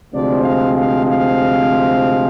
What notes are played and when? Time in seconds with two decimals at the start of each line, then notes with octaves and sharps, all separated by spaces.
0.14 D2 C3 F3 G#3 C4 D5
0.45 F5
0.75 F5
1.07 F5